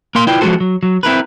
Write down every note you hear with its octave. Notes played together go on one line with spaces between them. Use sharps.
A#3 A#4 F5 C6
E4 F4 B4 D5 G5
F3 G#3 C4 F#4 A4 C5
F#3
F#3
C4 E4 A#4 B4